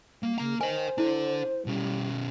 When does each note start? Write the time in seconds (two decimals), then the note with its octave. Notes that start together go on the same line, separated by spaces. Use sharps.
0.23 G3 A#3
0.38 C#3 A#3 A#5
0.61 A#4 C5 D#5 G#5
0.98 D4 E4 A4
1.66 B2 G3 C#4